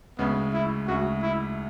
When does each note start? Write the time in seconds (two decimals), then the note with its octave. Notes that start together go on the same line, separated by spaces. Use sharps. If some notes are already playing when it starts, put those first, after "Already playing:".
0.18 D2 C#3 G#3 B3
0.53 E4
0.88 D2 C#3 G#3 F#4
1.22 E4